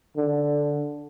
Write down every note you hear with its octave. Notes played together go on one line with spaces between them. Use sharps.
D3